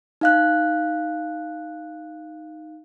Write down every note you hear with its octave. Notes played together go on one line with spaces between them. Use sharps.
D#4 F5 F#6